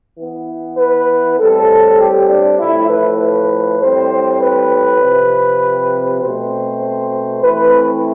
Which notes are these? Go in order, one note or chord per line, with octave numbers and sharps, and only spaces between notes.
E3 B3
B4
A2 G3 C4 A4
G4
D4
A2 F3 A3 E4
B4
B4
A2 G3 C4 C5
B4
C3 F3 C4
B2 A3 C4 C5
E3 A3 C4 B4